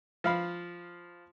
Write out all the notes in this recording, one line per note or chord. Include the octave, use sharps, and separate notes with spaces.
F3 F5 B5